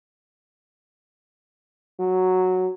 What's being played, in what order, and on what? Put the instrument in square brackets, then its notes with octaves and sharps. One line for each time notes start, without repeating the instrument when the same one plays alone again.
[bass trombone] F#3